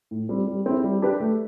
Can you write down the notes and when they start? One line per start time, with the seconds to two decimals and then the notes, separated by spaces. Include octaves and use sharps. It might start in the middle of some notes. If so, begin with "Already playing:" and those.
0.11 A2
0.29 G3 C4
0.47 G3
0.66 C4 E4
0.84 G3
1.02 D4 G4 B4
1.20 A3